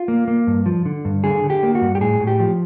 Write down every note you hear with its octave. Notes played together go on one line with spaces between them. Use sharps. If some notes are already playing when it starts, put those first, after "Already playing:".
Already playing: F4
A#3
A#3
G2
F3
D3
G2
D3 G#4
D3
G4
A#3
F#4
G2
G4
A2 G#4
A2
G4
F3